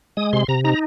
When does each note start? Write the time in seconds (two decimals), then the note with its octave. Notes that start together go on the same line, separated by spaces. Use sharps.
0.17 G#3 D#6
0.33 C3 C6
0.48 C3 A#5
0.64 D#4 A#5